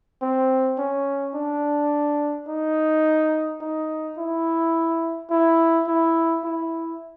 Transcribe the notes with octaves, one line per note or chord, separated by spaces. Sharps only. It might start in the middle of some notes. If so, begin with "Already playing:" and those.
C4
C#4
D4
D#4
D#4
E4
E4
E4
E4